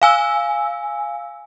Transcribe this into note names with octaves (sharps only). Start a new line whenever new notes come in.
F5 G#5 E6